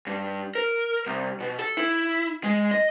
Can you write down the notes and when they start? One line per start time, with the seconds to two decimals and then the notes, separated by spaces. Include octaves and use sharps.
0.07 G2
0.55 A#4
1.07 C2
1.40 B2
1.59 A4
1.77 E4
2.44 G#3
2.71 D#5